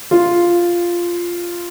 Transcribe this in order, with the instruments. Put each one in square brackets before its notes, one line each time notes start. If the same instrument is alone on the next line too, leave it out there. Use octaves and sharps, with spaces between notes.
[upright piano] F4